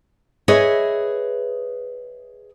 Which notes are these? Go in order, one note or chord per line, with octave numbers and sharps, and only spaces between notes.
G#4 B4 C#5 D#5 E5